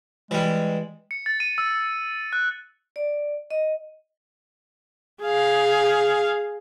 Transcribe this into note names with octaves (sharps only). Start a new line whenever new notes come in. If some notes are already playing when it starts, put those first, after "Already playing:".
E3 G3 G#3
C#7
A6
D#7
E6
F#6
D5
D#5
G#4 F5